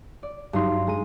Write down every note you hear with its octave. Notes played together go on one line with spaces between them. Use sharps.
D5
G2 F#3 D#4 C6
G#3 A#5 D#7